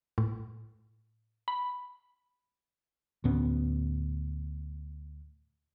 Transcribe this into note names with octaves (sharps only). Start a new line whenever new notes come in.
A2
B5
D2 A2 B3 C#4